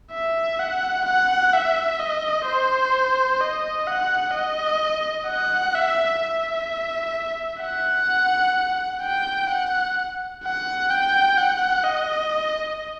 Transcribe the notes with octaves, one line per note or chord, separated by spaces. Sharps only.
E5
F#5
F#5
E5
D#5
C5
D#5
F#5
D#5
F#5
E5
E5
F#5
G5
F#5
F#5
G5
F#5
D#5